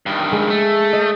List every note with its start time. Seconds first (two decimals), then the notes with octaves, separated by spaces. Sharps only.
0.06 G2 D#3
0.32 G#3
0.50 A3
0.93 D#5